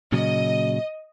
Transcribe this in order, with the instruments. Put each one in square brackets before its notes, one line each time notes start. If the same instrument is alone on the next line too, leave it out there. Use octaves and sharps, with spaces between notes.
[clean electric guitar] A#2 C#3 F#3 [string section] D#5